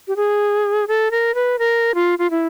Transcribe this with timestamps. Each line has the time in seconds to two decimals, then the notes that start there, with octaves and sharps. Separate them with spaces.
0.08 G4
0.16 G#4
0.88 A4
1.11 A#4
1.35 B4
1.59 A#4
1.95 F4
2.19 F4
2.31 E4